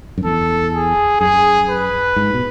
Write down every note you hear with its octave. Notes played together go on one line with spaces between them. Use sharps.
F#2
E2 A4
G#4
F#2 G#4
B4
G#2
B2